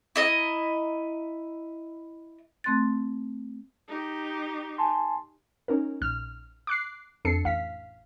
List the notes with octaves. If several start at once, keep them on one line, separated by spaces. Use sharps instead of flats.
E4 D#5 A#5
A3 C4 C6 F#6 A6
D#4 G4
G#5 A5 C6
C#4 D#4 A#4
A#1 F6
D6 F#6 C7
F2 D4 A4 C7 C#7
A1 F5 B6